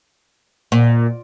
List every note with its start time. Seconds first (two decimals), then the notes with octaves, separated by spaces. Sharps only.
0.72 A#2